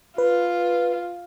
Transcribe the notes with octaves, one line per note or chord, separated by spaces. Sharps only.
F4 B4